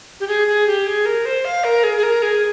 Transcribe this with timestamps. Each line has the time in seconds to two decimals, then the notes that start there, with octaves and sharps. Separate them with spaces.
0.20 G4
0.28 G#4
0.47 G#4
0.67 G4
0.86 G#4
1.05 A#4
1.25 C5
1.45 F5
1.64 A#4
1.83 G#4
1.97 G#4
2.03 A#4
2.22 G#4